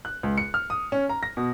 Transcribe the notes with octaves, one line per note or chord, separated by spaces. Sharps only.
F#6
C#2
C#7
F6
D#6
C#4
A#5
A#6
B2